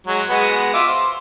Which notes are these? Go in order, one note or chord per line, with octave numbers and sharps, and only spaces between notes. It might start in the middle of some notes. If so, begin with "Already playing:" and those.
F#3 G#3
G#3 B3 F#4
F4 E5 D6
C5